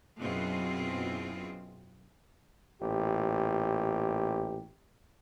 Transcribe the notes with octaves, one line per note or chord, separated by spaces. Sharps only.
F#2 B2 C4 E4 F4 G#4
A1 A#2 G4